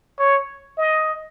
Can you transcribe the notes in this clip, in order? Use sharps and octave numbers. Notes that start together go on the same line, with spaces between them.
C#5
D#5